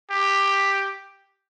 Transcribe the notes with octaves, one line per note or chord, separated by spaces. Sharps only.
G4